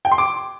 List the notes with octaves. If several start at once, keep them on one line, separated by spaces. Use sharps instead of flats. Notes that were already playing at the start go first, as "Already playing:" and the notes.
G5
C6
D6